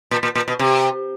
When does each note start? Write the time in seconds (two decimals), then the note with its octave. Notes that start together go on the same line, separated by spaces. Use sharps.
0.11 A#2
0.23 A#2
0.35 A#2
0.48 B2
0.59 C3